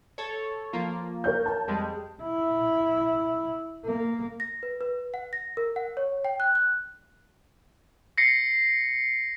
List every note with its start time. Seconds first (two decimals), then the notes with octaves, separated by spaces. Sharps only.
0.18 A4 C#5
0.73 F3 A#3 F4
1.24 A#4 C#5 G6
1.46 A5
1.68 F2 G3 G#3
2.23 E4
3.85 A#3
4.40 A#6
4.63 B4
4.81 B4
5.14 F#5
5.33 A#6
5.57 A#4
5.76 F#5
5.97 C#5
6.25 G5
6.40 F#6
6.55 F#6
8.18 A#6 C7 C#7